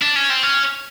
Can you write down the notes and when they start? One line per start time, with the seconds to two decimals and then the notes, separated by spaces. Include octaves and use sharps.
0.02 D4
0.15 C#4
0.30 C4
0.43 C#4